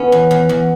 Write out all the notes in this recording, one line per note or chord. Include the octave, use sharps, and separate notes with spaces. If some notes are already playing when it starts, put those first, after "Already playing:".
Already playing: E3 B3 C#4
E2
E2
E2